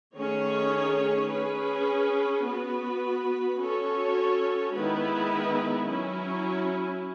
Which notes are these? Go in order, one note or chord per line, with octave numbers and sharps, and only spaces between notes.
D#3 A3 C#4 G#4 C#5
C#4 G#4 B4
B3 F#4 B4
C#4 F#4 A4 C#5
D#3 G#3 B3 E4 B4
F#3 C#4 E4